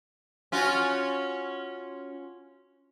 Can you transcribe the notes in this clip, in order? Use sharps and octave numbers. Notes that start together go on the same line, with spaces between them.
C#4 F4 F#4